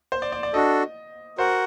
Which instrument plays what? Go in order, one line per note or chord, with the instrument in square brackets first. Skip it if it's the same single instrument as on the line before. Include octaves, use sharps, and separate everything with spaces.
[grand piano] C5
D5
D5
D5
[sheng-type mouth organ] D4 F#4 A4 [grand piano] D#5
[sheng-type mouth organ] F#4 A#4 F#5 [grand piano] C5